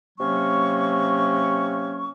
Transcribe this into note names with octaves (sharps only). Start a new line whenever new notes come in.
C3 F#3 A#3 C#4 C#6